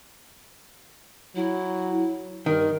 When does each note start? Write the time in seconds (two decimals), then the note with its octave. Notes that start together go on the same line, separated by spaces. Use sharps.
1.36 F#3 E4
2.46 G2 D#3 A#4